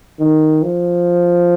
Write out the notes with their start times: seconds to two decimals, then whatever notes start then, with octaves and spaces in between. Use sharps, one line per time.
0.20 D#3
0.63 F3